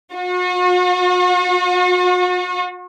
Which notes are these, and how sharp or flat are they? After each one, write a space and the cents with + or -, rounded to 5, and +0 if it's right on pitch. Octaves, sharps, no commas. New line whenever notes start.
F#4 -40